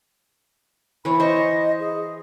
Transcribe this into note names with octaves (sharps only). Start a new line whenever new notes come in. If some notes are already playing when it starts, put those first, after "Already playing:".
E3 C#5 B5
C5 D#5 C#6
G#4